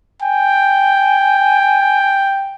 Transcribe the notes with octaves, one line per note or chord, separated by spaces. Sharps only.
G5 G#5